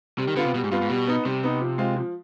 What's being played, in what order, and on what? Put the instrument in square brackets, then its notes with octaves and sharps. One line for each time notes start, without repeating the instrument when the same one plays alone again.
[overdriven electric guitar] C3 [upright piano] G3
[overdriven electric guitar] D#3
[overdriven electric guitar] D3 [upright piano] B3 F4
[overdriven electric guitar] C3
[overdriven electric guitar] B2 [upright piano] G3
[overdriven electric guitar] G#2
[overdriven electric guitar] G2 [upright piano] B3 F4
[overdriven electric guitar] G#2
[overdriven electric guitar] B2 [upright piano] G3
[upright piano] B3 D#4
[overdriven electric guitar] C3 [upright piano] G3
[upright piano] B3 D#4
F3
G#3 C4 F4
F3